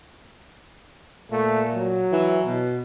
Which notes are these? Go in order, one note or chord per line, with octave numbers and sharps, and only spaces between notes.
A#2 A3
F#3
E3
B2